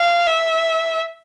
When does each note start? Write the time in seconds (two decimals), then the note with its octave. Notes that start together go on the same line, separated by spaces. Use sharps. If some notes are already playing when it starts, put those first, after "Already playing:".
Already playing: F5
0.27 E5